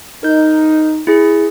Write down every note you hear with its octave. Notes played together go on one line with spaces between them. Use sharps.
D#4 A#4 G6
E4 G#4